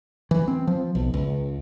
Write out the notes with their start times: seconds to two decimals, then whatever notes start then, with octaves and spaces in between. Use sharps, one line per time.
0.31 E3
0.48 C4
0.67 F3
0.95 B1
1.14 C#2